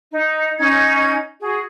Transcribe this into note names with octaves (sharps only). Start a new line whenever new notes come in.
D#4
C#4 D#4 G#6
F#4 G#4